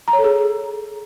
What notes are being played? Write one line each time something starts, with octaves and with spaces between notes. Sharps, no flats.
A#5
C#5
A4
G#4